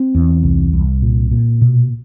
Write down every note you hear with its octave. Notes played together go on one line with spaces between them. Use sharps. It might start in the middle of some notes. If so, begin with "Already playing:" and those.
Already playing: C4
E2
C2
C2
A#2
A#2
B2